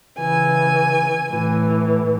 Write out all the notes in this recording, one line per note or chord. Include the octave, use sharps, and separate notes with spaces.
C#3 E3 G#5
A2 E3